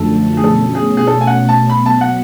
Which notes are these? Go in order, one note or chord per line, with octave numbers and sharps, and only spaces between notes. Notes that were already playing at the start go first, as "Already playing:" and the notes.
Already playing: F#2 D3 F3 A3 A4
G#4
B2 A3 C#4 A4
G#4
G#4
A4
G#5
F#5
A5
B2 F#3 B3 B5
A5
F#5